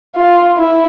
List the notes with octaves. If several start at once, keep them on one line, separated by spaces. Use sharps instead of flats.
F4
E4